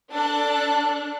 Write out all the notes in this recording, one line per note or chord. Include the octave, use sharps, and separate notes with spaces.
D4 A4 F#6